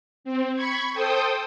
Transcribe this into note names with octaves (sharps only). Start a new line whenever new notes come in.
C4
B5 C#6 G#6
A4 C5 G5 D#6